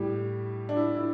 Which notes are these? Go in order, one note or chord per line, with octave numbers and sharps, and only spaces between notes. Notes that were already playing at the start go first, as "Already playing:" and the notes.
Already playing: A2 G3 G4
D4
E4
E4